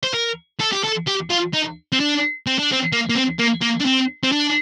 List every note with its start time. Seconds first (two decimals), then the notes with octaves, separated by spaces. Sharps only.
0.03 C5
0.14 A#4
0.60 A4
0.72 G4
0.84 A4
1.07 G4
1.30 F4
1.54 D#4
1.92 C4
2.00 D4
2.47 C4
2.59 D4
2.72 C4
2.92 A#3
3.09 A#3
3.15 C4
3.39 A#3
3.62 A#3
3.80 D4
3.85 C4
4.23 C4
4.32 D4